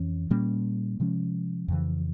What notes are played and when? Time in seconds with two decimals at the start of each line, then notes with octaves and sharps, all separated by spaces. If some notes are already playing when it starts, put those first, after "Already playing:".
Already playing: F2 E3 C#4
0.30 A#2 G3 A#3 C#4
1.00 C3 F3 G#3 C#4
1.68 F2 C#3 E3